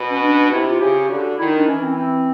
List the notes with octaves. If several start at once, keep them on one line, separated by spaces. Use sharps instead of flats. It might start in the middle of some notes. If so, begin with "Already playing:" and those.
Already playing: B2
C#4
D4
C3 E4
F4
C#3 G4
D3 F#4
D#3 E4
D#4
D4
E3 C#4
C4
C4